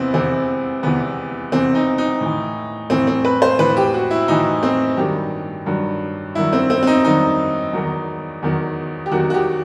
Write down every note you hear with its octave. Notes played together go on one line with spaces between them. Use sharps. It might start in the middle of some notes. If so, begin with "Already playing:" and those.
Already playing: E2 C3 E3 B3 C4 E4
E2 C3 E3 C4
E2 C3 E3 B3
E2 C3 E3 C4
D#4
D#4
A2 E3
A2 E3 C4
C4
B4
C5
A2 E3 B4
G4
F#4
E4
A2 E3 D#4
C4
G2 D#3 F#3 G4
G2 D#3 F#3
G2 D#3 F#3 E4
C4
C4
C4
D#4
G2 D#3 F#3 D#4
E2 D#3 F#3
E2 D#3 F#3
G4
E2 D#3 F#3 F#4
F#4
G4